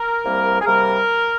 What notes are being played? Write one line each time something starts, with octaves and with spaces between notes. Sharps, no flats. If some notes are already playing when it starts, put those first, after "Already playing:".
Already playing: A#4
C2 C3 G3 A#3
G#4
C3 G3 A#3 A#4